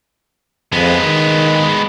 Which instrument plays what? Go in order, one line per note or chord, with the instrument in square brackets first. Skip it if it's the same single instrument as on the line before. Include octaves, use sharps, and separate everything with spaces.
[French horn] F2 [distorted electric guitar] G#3 B3
[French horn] D#3